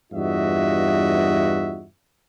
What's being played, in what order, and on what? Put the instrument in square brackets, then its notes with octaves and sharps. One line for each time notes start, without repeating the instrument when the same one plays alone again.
[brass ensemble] E2 G2 F4 F#4 D#5 E5